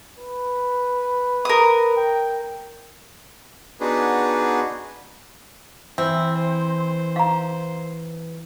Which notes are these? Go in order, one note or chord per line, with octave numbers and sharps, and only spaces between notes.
B4
A#4 D#6
G5
B3 D4 D#4 F#4 G#4 B4
E3 C4 E5
C5
F5 A#5